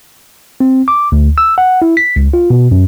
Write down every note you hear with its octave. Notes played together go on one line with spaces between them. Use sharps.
C4
D6
D2
E6
F#5
E4
B6
C#2
F4
B2
F#2